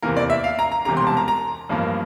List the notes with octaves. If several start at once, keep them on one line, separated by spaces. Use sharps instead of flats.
E2 C3 E3 A#3 A#4
D5
E5
F5
A#5
A#5
E1 E2 C3 G3 A#5
C6
A5
A#5
A#5
A1 G2 F3 A#3